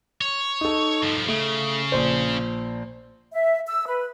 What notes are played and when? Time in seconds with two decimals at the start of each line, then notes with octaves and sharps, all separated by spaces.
0.21 C#5
0.61 D#4 A4
1.03 G2 F3
1.28 C#3 A3
1.92 A#1 C5
3.33 E5
3.67 E6
3.86 B4